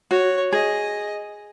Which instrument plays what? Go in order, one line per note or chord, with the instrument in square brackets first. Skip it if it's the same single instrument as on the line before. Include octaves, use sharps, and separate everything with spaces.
[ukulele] F#4 [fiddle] C#5
[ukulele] G#4 [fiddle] D#5